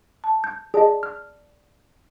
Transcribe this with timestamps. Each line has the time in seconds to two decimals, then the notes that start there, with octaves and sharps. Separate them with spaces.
0.24 A5
0.44 G6
0.74 G#4 D5 D#5 A5
1.03 F6